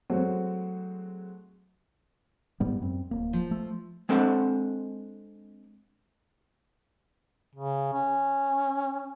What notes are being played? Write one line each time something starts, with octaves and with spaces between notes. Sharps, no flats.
F#3 G#3 A3 C4 F#4
G#2 G3 B3
F#2 C4
D1 A#3
F3
A3
G#3 C4 D4 A4 F#5
C#3
C#4